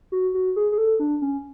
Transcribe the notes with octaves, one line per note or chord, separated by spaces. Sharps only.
F#4
F#4
G#4
G#4
A4
D4
C#4